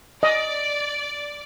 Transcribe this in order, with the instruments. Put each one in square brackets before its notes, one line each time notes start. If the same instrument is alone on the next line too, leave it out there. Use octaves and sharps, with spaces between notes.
[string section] D5 [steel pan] D#5